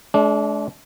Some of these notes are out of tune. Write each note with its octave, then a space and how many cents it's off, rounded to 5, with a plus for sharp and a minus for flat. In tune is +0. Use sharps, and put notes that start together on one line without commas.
G#3 +45 D4 -25